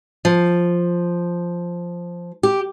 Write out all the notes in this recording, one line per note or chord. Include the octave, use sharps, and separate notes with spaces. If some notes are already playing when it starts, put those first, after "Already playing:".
F3
G4